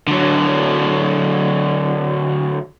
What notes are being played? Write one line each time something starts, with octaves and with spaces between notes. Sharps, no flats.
D3 F#3